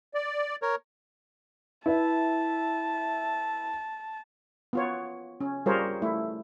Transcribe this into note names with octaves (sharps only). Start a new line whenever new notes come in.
D5
A#4 C#5
E4 B4 E5 A5
B3 F4 C#5
C#4
G3 F4 G#4 A#4 C5 C#5
A3 E4